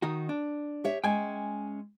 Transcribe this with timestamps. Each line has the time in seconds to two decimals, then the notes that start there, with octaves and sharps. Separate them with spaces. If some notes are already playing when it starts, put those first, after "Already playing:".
0.02 D#3 D#4 F#4
0.29 D4
0.84 G4 C#5 E5
1.04 G#3 C#4 G5 G#5